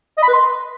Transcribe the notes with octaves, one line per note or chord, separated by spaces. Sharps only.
D#5
B5
B4
C6